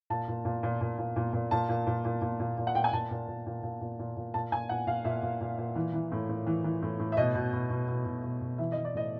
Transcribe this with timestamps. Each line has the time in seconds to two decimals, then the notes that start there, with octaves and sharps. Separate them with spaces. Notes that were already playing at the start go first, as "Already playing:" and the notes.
0.10 A#2 A5
0.28 A#2
0.45 A#2
0.63 A#2
0.81 A#2
0.98 A#2
1.16 A#2
1.33 A#2
1.51 A#2 A5
1.69 A#2
1.87 A#2
2.05 A#2
2.22 A#2
2.40 A#2
2.58 A#2
2.67 F#5
2.75 A#2 G5
2.84 G#5
2.93 A#2 A5
3.11 A#2
3.28 A#2
3.46 A#2
3.63 A#2
3.81 A#2
3.99 A#2
4.17 A#2
4.34 A#2 A5
4.52 A#2 G#5
4.69 A#2 F#5
4.87 A#2 F5
5.05 A#2 E5
5.22 A#2
5.41 A#2
5.58 A#2
5.76 E3
5.93 E3
6.12 A2
6.29 A2
6.47 E3
6.64 E3
6.82 A2
7.00 A2
7.12 E5
7.17 B2 D#5
7.35 B2
7.53 B2
7.70 B2
7.88 B2
8.06 B2
8.23 B2
8.41 B2
8.58 E3 E5
8.72 E3 D#5
8.85 D5
8.94 A2 D#5